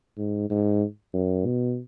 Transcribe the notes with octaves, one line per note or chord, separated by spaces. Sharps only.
G#2
G#2
F#2
B2